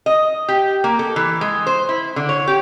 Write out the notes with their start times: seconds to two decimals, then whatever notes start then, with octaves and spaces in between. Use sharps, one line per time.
0.06 D#5
0.48 G4
0.84 A#3
0.99 A4
1.16 E3
1.41 G#3
1.67 C5
1.89 E4
2.16 D3
2.29 C#5
2.47 G4